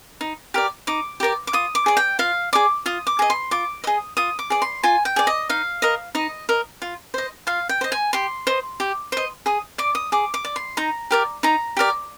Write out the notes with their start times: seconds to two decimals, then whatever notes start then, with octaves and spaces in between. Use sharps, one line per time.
0.21 D#4
0.54 G4 A#4 D5
0.87 D#4 D6
1.20 G4 A#4 D5
1.47 D6
1.53 F4 D#6
1.75 D6
1.86 G#4 D5
1.97 G5
2.19 F4 F5
2.53 G#4 D5 D6
2.86 F4 D#6
3.07 D6
3.19 G#4 D#5
3.30 C6
3.51 F4 D6
3.84 G#4 D#5 D#6
4.17 F4 D#6
4.39 D6
4.50 G#4 D5
4.62 C6
4.83 F4 G#5
5.05 G5
5.16 G#4 D5
5.27 D#5
5.49 D#4 F5
5.82 A#4 D#5
6.15 D#4 D#5
6.49 A#4 D#5
6.82 F4
7.14 C5 D#5
7.47 F4 F5
7.69 G5
7.81 C5 D#5
7.92 G#5
8.13 G4 C6
8.47 C5 D#5
8.80 G4
9.12 C5 D#5
9.46 G#4 D#6
9.78 D5 D6
9.95 D#6
10.12 G#4 D6
10.34 D6
10.45 D5
10.56 C6
10.77 D#4 A#5
11.11 G4 A#4 D5
11.43 D#4 A#5
11.77 G4 A#4 D5